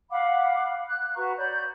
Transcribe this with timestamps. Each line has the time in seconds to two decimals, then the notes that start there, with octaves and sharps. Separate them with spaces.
0.10 F5 F#5 B5 D6
0.89 F#6
1.15 F#4 B4 A#5 C#6
1.37 C#5 D5 B5 G6